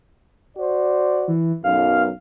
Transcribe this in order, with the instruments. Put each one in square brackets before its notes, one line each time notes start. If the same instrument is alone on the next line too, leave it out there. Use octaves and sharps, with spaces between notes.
[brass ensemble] F#4 C5 D5
[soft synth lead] E3
[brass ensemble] B1 F#2 [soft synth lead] F5